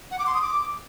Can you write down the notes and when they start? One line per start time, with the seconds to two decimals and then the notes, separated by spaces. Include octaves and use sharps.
0.11 F#5
0.19 D6
0.26 C6
0.34 D#6
0.42 D6